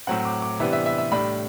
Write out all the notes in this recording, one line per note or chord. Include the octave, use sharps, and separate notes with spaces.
A2 F#3 C4 F#5
D6
D6
C3 E3 G3 B3 D4 E5
E5
E5
E5
A2 G3 D4 B5